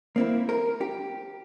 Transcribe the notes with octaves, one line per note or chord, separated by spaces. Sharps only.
A#3 C4 E4
A#4
G4